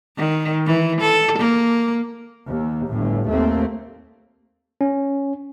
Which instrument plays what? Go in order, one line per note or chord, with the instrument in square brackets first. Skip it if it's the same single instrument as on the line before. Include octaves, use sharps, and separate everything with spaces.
[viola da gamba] D#3
E3
A4
A#3
[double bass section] D#2
G1 A2
D#2 A3 A#3 C4
[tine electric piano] C#4